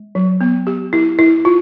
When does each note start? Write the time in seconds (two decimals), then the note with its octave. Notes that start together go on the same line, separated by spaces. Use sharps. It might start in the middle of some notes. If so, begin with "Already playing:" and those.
Already playing: G#3
0.15 F#3
0.41 B3
0.67 G4
0.93 E4
1.19 E4
1.45 F4